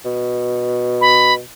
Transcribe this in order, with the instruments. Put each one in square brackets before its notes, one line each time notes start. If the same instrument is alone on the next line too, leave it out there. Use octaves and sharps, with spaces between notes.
[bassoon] B2
[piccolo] B5